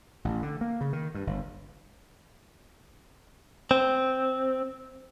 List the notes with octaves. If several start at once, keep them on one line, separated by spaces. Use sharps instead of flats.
A1
D3
A#3
C#3
D#3
G2
G1
C4